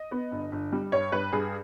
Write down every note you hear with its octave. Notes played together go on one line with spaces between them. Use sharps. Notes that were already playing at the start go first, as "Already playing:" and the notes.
Already playing: D#5
B3
G1
G1
G3
G2 C#5
G2 B4
G2 G#4